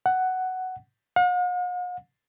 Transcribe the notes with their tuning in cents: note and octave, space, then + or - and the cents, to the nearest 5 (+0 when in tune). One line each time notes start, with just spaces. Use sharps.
F#5 +10
F#5 -45